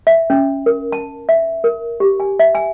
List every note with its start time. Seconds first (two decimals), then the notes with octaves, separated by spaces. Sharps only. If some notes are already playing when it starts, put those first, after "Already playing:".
0.07 E5
0.30 C#4
0.66 A#4
0.92 A5
1.29 E5
1.64 A#4
2.00 G4
2.20 G#5
2.39 E5
2.55 G#5